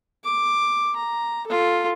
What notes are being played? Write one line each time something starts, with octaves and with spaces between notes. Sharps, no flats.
D6
A#5
F4 A4